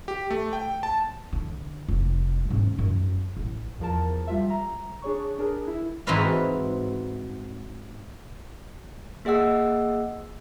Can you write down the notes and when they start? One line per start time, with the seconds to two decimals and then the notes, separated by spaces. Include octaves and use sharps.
0.08 G4
0.30 A3
0.53 G5
0.83 A5
1.33 D3
1.88 F1
2.50 G#2 C#4
2.79 F#2
3.37 A1
3.79 E2 F3 A#4 A5
4.27 G3 F4 E5
4.50 A#5
5.02 D4 G#4 C#5 C#6
5.38 D4 G#4 A#4
5.67 E4
6.07 G#2 E3 C4 F#4 B4 F5
9.25 A#3 G#4 D#5 F#5 E6